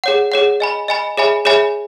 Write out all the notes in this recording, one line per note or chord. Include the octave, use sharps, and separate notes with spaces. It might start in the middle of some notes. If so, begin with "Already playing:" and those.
G#4 C#5 F#5
G#4 C#5 F#5
D#5 G#5 B5
D#5 G#5 B5
G#4 C#5 E5 G#5 B5
G#4 C#5 E5 G#5 B5